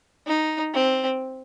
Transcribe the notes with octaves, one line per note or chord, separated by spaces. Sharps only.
D#4
C4